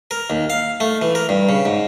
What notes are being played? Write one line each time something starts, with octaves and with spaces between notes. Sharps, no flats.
A#4
D#2
F5
A3
E3
A#4
G2
C#3
G#2